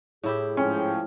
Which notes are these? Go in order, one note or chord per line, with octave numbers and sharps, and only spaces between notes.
A2 E4 G4 G#4
G#2 F3 C#4 G5